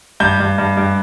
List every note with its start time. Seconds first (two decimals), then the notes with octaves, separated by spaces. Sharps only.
0.20 G2 G6
0.40 G2
0.58 G2
0.77 G2